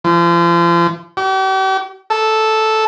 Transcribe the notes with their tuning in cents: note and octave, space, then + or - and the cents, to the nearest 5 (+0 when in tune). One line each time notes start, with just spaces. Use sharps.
F3 -35
G4 -45
A4 -5